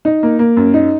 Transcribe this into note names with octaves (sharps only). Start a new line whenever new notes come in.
D#4
A#3
A#3
F#2
D#4